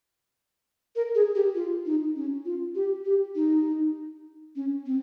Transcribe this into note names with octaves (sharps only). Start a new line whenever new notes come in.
A#4
G#4
G4
F4
D#4
C#4
F4
G4
G4
D#4
C#4
C4